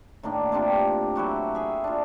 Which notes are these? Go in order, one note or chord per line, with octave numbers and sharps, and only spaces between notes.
A2 D#3 A#3 D4
C3 C4 D4 F4
F#3 E4 F#4 G4
G#4 E5
D4 F4